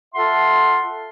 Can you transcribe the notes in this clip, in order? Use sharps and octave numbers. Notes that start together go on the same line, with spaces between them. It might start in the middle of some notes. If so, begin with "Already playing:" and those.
F4 A4 E5 F#5 C6